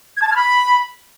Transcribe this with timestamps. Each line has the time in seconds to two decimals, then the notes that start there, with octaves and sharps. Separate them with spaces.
0.16 G#6
0.21 A5
0.26 G#6
0.31 F6
0.36 B5